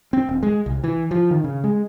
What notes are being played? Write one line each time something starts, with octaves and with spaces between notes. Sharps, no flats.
C4
D#1
G#3
C2
E3
F3
D#3
C#3
G#3